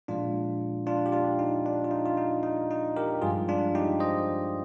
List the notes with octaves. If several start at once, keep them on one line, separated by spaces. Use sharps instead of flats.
A#2 F3 G#3 D4 F4
D4 F4
G4
D4 F4
D#4
D4
F4
D#4
F4
D#4
D#4
D#4
G4 A#4
G2 F3 G#3 F4 G#4
D4 F4
D#4 G4
C5 D#5